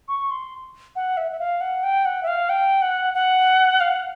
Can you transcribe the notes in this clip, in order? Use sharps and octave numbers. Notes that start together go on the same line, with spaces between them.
C#6
C6
F#5
E5
E5
F5
F#5
G5
F#5
E5
F5
G5
F#5
F#5
F5
F#5